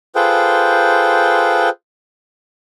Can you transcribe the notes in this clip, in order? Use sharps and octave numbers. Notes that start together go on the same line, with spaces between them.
F4 G#4 A4 B4 C5 G5